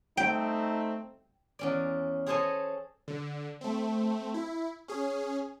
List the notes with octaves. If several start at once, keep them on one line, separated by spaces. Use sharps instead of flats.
A3 C4 D#4 G5
E2 C#4 D5
G#4 A4 C5 C#5 D#5 G#5
D3
A3 C4
E4
C#4 G#4